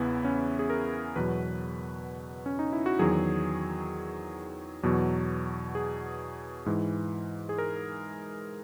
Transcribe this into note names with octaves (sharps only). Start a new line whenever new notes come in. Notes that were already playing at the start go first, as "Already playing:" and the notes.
Already playing: E2 C#3 E3 B3 E4
C#4
G#4
A#4
E2 B2 F#3 B4
C#4
D#4
E4
F#4
E2 D#3 F#3 G#4
E2 B2 F#3
G#4
G#2 E3
G#4
A#4